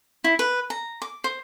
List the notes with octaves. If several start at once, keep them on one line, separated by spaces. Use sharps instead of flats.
E4
B4
A#5
D6
C5